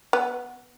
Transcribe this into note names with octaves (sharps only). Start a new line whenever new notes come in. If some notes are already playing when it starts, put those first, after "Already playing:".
B3